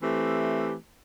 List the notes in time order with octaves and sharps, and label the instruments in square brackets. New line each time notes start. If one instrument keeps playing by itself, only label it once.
[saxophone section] E3 A3 C4 G4